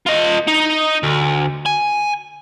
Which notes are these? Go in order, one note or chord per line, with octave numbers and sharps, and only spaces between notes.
F4 D#5
D#4
D2
G#5